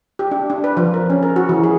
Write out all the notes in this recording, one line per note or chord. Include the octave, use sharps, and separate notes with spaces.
G4
D4
D4
B4
F3
A#4
C#4
A#4
F#4
E3
G#4